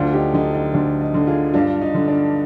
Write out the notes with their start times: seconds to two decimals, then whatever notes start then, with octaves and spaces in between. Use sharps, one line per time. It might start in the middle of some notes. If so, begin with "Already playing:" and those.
Already playing: D2 D4 F4
0.13 D#4 G4
0.34 D3 D#4
0.55 D#4
0.74 D2 D4
1.01 D#4
1.14 D3
1.27 F4 G#4
1.54 G2 D4 F4
1.81 D#4
1.94 D3
2.08 D4